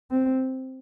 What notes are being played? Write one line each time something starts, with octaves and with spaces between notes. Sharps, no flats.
C4